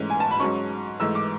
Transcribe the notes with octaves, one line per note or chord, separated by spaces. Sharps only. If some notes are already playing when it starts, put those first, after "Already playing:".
Already playing: G#2 E3 A3 C#4
G#5
A5
B5
G#2 F#3 C#4 C#6
G#2 E3 A3 E6
D6